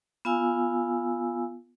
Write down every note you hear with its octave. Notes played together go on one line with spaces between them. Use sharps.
B3 F4 F5 G#5 E6